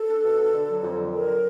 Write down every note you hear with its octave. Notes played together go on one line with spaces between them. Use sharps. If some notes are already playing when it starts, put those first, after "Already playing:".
Already playing: A4
D4
B2
D4
D3
F#3
F2
D3
F#3 A#4